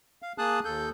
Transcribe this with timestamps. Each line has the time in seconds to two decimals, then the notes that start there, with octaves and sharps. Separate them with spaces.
0.22 F5
0.38 A#3 G#4 A5 D#6 F#6
0.65 D#2 A4 G6